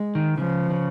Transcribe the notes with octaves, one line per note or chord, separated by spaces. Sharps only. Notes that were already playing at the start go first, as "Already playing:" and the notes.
Already playing: G#3
D#3
C#3 F3
C#3